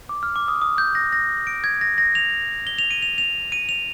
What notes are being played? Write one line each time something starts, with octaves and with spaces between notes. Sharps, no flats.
D6
F6
D6
D#6
D#6
G6
A#6
A#6
D7
G#6
A#6
A#6
F7
G7
F7
D#7
F7
F7
D#7
F7